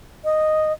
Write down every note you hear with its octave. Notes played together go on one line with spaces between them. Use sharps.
D#5